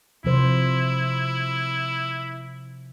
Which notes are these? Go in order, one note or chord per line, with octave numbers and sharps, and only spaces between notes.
C3 F3 E4 C5